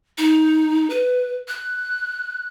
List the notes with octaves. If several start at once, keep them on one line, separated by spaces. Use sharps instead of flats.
D#4
B4
F#6